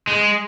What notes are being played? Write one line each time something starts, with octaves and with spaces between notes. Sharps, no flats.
G#3